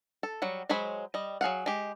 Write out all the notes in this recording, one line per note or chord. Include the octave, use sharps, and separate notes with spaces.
A4
F#3 G3 F#5
F#3 G#3 C5 C#5 B5
G3 D#5
F#3 G#4 F5 F#5
G#3 G4